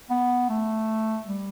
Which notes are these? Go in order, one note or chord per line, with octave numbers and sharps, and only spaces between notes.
B3
A3
G3